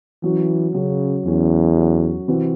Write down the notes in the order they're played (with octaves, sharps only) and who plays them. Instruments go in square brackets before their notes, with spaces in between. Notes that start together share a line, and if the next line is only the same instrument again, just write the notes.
[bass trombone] E3 [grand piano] F#3 C#4 F#4
[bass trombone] C#3 [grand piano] F#3 C#4 F#4
[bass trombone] E2 [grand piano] F#3 C#4 F#4
[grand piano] F#3 C#4 F#4
C3 E3 C4 F#4